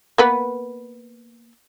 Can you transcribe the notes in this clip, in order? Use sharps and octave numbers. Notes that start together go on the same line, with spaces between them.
A#3 B3 B4